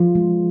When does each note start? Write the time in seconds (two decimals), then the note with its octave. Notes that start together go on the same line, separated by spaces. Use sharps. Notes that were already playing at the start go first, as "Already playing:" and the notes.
Already playing: F3 F4
0.15 G#3